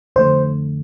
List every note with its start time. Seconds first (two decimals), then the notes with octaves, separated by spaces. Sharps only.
0.16 F2 D3 A3 C5